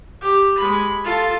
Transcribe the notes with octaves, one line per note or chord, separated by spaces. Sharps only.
G4
G#3 B5
F4 A4